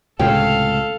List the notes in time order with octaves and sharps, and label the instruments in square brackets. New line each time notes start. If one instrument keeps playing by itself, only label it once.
[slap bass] C#2 A2 C3 [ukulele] G#4 G5 [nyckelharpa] A4 F5